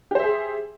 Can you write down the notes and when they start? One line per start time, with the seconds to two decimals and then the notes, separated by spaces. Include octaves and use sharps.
0.11 G4
0.15 C5
0.20 E5
0.24 G#4